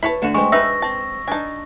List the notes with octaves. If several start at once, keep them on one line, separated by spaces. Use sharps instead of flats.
E4 B4 C#5 A5 B6
D3 A3 F#4 E7
G#3 C4 C#6
D#4 B4 E5 E6 A#6
C4 A5
D4 D#4 G#5 A5